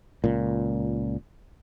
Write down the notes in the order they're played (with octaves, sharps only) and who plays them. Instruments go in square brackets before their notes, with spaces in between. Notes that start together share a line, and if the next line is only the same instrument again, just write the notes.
[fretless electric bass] C#2 A#2